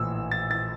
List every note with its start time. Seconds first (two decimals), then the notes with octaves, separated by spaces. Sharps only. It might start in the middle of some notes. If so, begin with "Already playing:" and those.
Already playing: A#1 A2 E3 E6
0.31 A6
0.51 A6